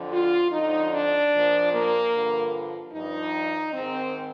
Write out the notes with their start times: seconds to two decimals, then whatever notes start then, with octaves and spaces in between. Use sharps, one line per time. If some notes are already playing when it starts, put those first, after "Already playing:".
Already playing: F2 D3 F3
0.13 F4
0.52 F2 D3 F3 D#4
0.92 D4
1.33 A#2 F3
1.72 A#3
2.13 G2 D3 F3
2.93 G2 F3 D#4
3.73 G#2 D#3 C4